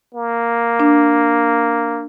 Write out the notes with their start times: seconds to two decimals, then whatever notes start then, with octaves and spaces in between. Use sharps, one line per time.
0.15 A#3
0.80 D4